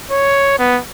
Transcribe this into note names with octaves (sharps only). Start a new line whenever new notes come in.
C#5
B3